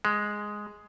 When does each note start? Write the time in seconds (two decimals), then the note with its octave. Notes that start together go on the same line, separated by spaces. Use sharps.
0.05 G#3